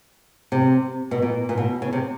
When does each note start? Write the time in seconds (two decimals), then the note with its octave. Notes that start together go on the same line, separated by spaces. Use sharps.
0.52 C3
1.11 B2
1.22 A#2
1.49 A#2
1.58 B2
1.82 C#3
1.93 C3